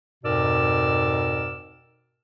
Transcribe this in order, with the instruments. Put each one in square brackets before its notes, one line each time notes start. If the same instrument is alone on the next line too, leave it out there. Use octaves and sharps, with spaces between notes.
[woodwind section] F2 G#2 B2 A#4 D5 E6